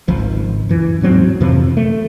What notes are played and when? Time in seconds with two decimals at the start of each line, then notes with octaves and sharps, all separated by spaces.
0.08 G#1 C#2 F3
0.69 F#2 E3
1.01 D#2 G#2 F#3 C4
1.40 F2 C3 E3 F3
1.77 A3